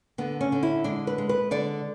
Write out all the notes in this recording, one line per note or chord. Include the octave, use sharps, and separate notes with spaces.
D3 B3
C#4
D3
E4
G#3 D4
B4
G#3
B4
D3 D5